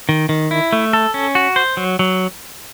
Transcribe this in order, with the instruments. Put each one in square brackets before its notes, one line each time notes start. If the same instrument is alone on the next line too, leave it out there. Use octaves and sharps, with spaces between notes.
[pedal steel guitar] D#3
D#3
E4
A3
A4
C#4
F#4
C5
F#3
F#3